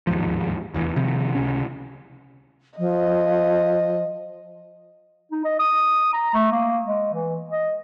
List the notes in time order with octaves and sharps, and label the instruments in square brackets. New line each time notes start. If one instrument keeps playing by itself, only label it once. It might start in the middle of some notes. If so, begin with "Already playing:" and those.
[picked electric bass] D1 D#2 G#2 F3
F1 E2 E3
C3 D#3 F3 C4
C#2 C3 C#4
[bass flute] F3 [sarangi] D#5
[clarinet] D#4
D#5
D#6
A#5
A3
A#3
G#3
E3
D#5